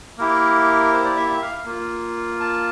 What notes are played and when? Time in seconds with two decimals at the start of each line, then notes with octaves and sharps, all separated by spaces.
0.18 A#3 E4 G4 A#4
0.93 C5
1.04 D5
1.17 E5
1.29 E5
1.41 F5
1.65 A#3 F4
2.40 A5